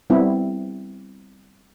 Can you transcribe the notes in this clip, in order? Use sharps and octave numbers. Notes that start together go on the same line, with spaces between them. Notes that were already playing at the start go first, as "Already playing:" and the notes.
G3 B3 C4 E4